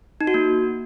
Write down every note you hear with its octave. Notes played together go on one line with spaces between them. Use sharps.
D#4
F#4
A#3